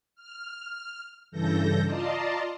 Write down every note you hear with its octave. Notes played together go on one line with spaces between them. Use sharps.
F6
G2 C#3 E3 A4 G6 A#6
F4 D5 D#5 A5 A#5 C6